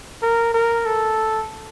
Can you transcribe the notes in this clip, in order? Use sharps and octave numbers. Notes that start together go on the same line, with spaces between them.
A#4
A#4
A4